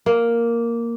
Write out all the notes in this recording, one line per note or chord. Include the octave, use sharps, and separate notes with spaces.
A#3